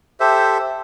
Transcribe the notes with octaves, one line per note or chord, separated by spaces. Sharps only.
G4 A4 C5 E5